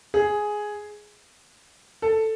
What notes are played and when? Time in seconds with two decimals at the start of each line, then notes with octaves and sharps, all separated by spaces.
0.14 G#4
2.02 A4